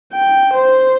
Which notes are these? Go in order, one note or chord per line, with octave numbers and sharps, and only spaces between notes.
G5
C5